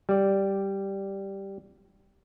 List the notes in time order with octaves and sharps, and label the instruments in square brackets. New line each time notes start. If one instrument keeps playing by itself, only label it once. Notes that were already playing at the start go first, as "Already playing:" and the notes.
[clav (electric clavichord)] G3 D5